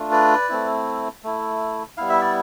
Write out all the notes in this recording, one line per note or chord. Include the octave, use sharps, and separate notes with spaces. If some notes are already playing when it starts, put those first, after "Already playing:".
Already playing: A3 D4 F4
B4 D5
A3 C4 E4
A3 E4
G3 B3 E4 F5
E5
D5